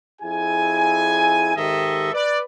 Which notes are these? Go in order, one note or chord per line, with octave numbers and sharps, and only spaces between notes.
F2 E4 G#4 G#5
G#2 D#3 G4 A4 D#5 E5
B4 D5